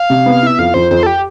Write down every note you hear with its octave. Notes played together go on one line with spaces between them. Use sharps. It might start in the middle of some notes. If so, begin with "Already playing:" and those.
Already playing: F5
C3
B3
E4 E5
F2 F5
F2 C5
F2 C5
A4
G4